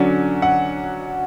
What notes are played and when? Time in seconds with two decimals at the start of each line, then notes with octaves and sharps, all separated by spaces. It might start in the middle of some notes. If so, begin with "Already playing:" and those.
Already playing: D3 F#3 C#4 D5
0.42 F#5